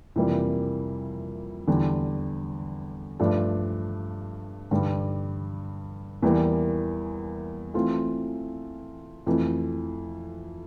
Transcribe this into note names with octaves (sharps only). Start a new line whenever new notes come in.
F2 C3 E3 G3 A#3
E2 D3 G3
G2 F3 A3 D4
G2 D3 G3
E2 E3 G3 A#3
E3 A3 C4 F4
F2 E3 A3